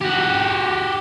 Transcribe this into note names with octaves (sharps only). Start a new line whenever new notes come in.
F#4 G4